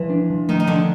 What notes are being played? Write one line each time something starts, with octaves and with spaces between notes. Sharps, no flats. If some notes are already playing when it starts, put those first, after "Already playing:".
Already playing: E3 F3
D4
F3
D#3 A3 D#4
D#4
D3 F3 D4